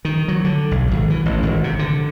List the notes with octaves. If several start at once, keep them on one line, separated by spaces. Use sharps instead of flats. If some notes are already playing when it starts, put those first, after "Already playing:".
D#3
F#3
D3
B1
G#1
E3
A1
G#1
C3
D3